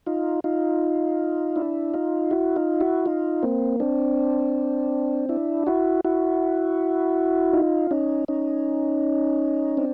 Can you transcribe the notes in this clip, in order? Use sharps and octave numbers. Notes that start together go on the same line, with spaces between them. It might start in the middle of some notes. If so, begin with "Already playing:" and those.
D#4 F4
D#4 F4
D4 E4
D#4 F4
E4 F#4
D#4 F4
E4 F#4
D#4 F4
A#3 C4
C4 D4
D4 E4
E4 F#4
E4 F#4
D#4 F4
C#4 D#4
C#4 D#4
C4 D4